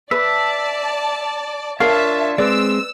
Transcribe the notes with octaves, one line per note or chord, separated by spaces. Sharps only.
B4 D5 E5 A5
D4 F4 A#4 C#5 E5 F5 A5
G#3 C4 B4 D5 E6